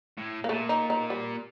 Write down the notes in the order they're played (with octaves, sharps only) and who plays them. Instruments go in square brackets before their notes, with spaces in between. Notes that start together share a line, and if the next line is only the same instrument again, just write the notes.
[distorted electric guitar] A2
[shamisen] A#3
[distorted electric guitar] A#2 [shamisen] A3
[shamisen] D#4
D#4
G3